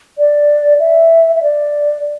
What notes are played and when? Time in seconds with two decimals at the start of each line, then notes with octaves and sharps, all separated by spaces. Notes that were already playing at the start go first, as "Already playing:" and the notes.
0.18 D5
0.80 E5
1.35 E5
1.42 D5